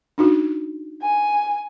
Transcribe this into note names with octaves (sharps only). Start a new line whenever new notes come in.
D4 D#4 F#4
G#5